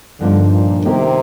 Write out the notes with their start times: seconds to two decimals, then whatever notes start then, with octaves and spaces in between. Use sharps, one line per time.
0.20 G2 D3 F3 A#3 D#4
0.53 A#2
0.85 C3 D#3 A#3 D#4 G4 A#4